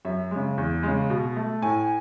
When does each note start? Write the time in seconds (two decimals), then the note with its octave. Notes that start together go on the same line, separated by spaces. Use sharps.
0.05 F#2 E5
0.31 C#3 G#3
0.58 E2
0.83 C#3 G#3
1.10 B2
1.37 A3
1.62 A2 G#5